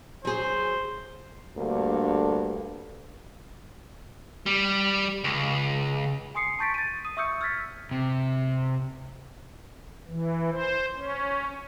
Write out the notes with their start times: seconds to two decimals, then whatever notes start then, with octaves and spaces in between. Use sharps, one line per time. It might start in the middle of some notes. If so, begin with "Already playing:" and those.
0.25 F#3 G#4 C5
1.57 D2 G2 A#3 A4
4.46 G3
5.24 C#2
6.35 G#5 C6 D#6 C7 C#7
6.59 A5 C#6 G6 A6 B6 D7
6.74 A6 D#7
7.05 D#6 D#7
7.17 E5 C#6 D#6 E6 G6 C#7
7.41 E6 F6 G#6 A6 B6
7.91 C3
10.08 E3
10.52 C5
10.94 C#4